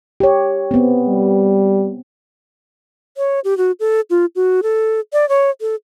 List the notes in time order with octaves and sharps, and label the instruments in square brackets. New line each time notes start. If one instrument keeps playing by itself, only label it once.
[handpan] G4 C#5
B3 C4
[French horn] G3
[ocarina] C#5
G4
F#4
A4
F4
F#4
A4
D5
C#5
A4